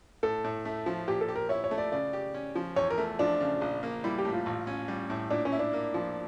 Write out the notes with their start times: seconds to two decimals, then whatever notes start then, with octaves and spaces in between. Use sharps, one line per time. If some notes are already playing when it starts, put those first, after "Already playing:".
0.23 A2 A4
0.44 A2
0.65 A3
0.86 F3
1.08 A#2 G4
1.21 A4
1.29 G4
1.36 A#4
1.49 E4 C#5
1.64 C#5
1.71 A3
1.78 D5
1.92 C#3 D5
2.13 G4
2.34 C#4
2.56 F3
2.76 E2 C#5
2.90 A#4
2.98 A3
3.19 F3 D4
3.40 C#3
3.61 A#1
3.83 A#3
4.04 G3 E4
4.18 G4
4.25 A2
4.32 F4
4.46 A1
4.67 C#4
4.88 G3
5.10 A2
5.30 A#2 D4
5.45 C#4
5.52 E4
5.59 D4
5.73 A#3
5.94 F3